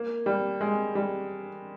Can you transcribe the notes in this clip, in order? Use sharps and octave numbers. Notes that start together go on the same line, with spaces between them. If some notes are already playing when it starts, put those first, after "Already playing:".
Already playing: A#3
G3
G#3
G3